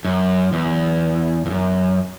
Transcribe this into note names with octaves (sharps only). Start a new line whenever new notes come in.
F#2
E2
E2
F#2